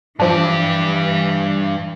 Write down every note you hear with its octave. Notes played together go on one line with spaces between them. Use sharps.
G2 E3 F3 D4 G4